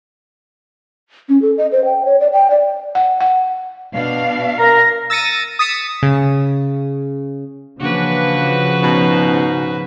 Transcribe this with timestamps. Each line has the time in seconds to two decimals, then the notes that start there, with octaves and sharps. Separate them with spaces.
1.29 C#4
1.42 A4
1.58 D#5
1.72 C5
1.85 G5
2.05 C#5
2.20 D5
2.33 G5
2.50 D5
2.95 F#5
3.21 F#5
3.92 B2 D4 F5
4.59 A#4 A#6
5.10 E6 A6 A#6 C#7 D#7
5.59 D#6 A6 B6 C#7 E7
6.03 C#3
7.80 C#3 E3 F3 A#3 D4 F#4 B4
8.83 G#2 B2 C#4 D#4